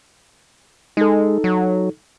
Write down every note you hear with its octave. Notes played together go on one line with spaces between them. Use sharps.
G#3 D#4 A4
F#3